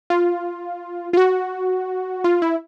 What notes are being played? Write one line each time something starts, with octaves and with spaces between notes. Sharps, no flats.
F4
F4
F#4
F4
E4